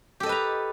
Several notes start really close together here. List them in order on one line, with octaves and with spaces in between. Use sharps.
G4 A4 D#5 B4 A#5